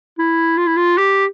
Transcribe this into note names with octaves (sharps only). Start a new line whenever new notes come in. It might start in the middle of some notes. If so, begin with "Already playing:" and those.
E4
F4
E4
F4
G4